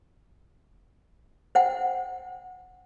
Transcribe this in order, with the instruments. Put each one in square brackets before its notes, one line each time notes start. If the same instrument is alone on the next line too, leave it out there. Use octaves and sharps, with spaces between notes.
[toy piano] C5 F#5 G5